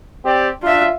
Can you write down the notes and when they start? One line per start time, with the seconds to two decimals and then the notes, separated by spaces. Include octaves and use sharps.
0.24 C4 G4 D5
0.63 D4 F4 E5